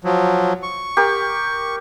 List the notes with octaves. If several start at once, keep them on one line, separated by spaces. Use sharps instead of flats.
F3 F#3
C#6
G4 A#4